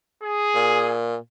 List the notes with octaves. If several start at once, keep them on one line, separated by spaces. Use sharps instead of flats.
G#4
A#2